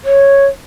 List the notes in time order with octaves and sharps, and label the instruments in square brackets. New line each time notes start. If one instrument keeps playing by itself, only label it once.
[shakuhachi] C#5